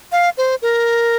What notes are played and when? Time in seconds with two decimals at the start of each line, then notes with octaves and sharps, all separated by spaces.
0.12 F5
0.38 C5
0.62 A#4